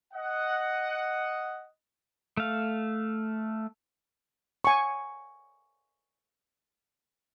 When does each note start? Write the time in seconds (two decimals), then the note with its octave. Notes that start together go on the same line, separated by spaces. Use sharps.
0.13 D#5 F#5
2.37 A3 F5
4.65 G#5 C#6